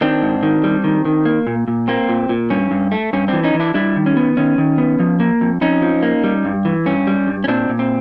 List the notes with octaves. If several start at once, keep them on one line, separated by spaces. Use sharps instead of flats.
D#3 C4 D4
G#2
D#3
G3
D#3
D#3
A#3
A#2
A#2
A#3 C4
A#2
A#2
G2 C#4
G2
A3
G2 C#4
E3 C4 D4
C#4 D#4
E3
D4 E4
G3 D4 E4
D#3
C#4
B3
D#3 C#4
D#3
B3
F3
A#3
F2
F2 C#4 D#4
F3
A#3
G3
G2
E3
G2 C#4
G3
G2
C#4
A#2 C4 D4
A#2
C4